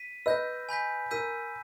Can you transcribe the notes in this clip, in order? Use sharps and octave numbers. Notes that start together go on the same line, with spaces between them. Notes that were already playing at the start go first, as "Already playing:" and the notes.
Already playing: B6 D#7
B4 D#5 E6 G6 A#6
G#5 B5 G6 B6
A#4 E6 G6 B6 D#7